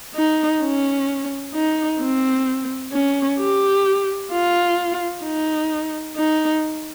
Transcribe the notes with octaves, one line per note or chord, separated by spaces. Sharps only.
D#4
C#4
D#4
C4
C#4
G4
F4
D#4
D#4